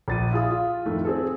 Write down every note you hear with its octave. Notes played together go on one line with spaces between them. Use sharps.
A#1 A6 D#7
E4 F4 G#4 D#6
F4
F2 A2 D#3 A3
C4 G#4 A4